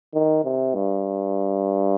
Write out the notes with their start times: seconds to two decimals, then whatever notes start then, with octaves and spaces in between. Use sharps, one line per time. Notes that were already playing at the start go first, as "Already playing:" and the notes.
0.14 D#3
0.44 C3
0.75 G2